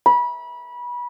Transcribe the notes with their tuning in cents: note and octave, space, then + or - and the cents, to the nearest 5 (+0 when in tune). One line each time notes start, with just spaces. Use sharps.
B5 -25